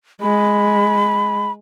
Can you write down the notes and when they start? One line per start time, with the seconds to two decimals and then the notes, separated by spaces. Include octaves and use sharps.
0.22 G#3 B5